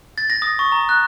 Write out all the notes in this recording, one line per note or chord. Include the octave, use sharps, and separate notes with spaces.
A6
A#6
D#6
C#6
A#5
F#6